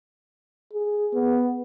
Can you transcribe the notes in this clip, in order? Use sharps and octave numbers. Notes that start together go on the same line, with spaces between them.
G#4
B3